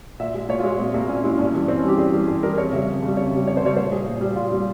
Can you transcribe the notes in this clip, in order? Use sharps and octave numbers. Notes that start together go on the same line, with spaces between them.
A#2 E5
G#3
A#2 C#5
F4
G#3
A#2 C4
G#3 A#3
A#2 C#4
G#3 E4
G2 C#4
E3 G3
G2 C4
C#4
E3 G3 G4
G2 G#4
E3 G3
G2 G#4
E3 G3 A#4
F2 C#5
C#3 G3 E5
F2
C#3 G3
F2 C#5
C#3 G3
F2 C#5
C5
C#3 G3 C#5
A#2 C5
G3 G#4
A#2
G3
A#2 F4
G3